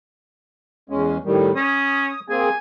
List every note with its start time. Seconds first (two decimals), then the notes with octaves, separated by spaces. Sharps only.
0.90 E2 G#3 C#4
1.25 A2 D#3 G3
1.55 C#4 D#6
2.29 A#3 C4 G#4 G#5